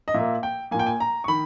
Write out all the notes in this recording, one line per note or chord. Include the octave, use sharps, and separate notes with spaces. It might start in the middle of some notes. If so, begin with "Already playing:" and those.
D#5
A#2 A#3 E5
G5
A#2 A#3 G#5
G5
G#5
A#5
C#6
D#3 B5